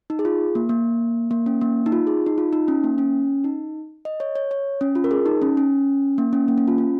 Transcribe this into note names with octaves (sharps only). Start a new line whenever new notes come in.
D#4
G#4
F4
A#3
A#3
A#3
C#4
A#3
D#4
F4
G#4
D#4
F4
D#4
C#4
A#3
C#4
D#4
D#5
C#5
C#5
C#5
C#4
F4
A#4
G#4
D#4
C#4
C#4
A#3
C#4
A#3
C#4
F4
C#4